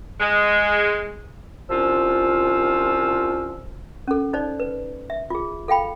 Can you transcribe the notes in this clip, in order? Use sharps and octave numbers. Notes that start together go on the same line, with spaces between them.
G#3
C2 F3 C#4 F4 E6
C#4 A4
D#4 C5 D5
B4
E5
F4 G#4
A4 F5 G5 B5